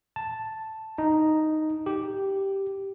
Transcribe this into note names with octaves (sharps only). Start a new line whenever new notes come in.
A5
D#4
G4